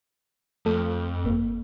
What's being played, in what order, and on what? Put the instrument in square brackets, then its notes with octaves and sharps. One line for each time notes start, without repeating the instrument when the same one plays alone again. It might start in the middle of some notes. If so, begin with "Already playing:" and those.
[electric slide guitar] F2 [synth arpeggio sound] A3 A4
[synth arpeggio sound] G1 A#3